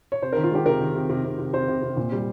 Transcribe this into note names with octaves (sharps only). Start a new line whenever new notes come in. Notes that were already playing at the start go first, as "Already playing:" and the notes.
C#5
C3 C5
D#3 A#4
F4
G#3 G4
C3 A#4
D#3
C3
C3
C3
C3
C3 C5
C3
C3
A#2
G3